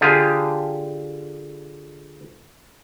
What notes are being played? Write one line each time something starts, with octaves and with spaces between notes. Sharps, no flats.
D3 F4 G4 G#4